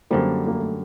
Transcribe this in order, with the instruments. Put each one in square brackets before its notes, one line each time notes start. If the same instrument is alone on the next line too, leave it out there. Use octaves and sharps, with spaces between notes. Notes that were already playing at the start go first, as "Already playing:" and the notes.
[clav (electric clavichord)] F#2 D3 G3 [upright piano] A#3 C4
[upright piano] A#3
A3